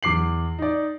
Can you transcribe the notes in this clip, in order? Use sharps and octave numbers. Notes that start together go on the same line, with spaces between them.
E2 D6 C7 F#7
D#4 D5